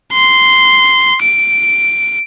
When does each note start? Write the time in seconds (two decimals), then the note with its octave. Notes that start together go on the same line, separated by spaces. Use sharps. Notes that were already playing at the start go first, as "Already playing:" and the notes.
0.13 C6
1.22 D7